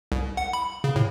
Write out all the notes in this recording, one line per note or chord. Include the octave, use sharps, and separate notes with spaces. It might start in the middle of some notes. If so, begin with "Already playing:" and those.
C2
F#5
B5
C#3
A2